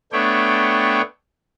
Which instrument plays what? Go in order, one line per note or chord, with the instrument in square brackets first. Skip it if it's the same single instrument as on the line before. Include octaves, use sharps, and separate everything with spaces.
[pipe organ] A3 B3 D4 C#5 G5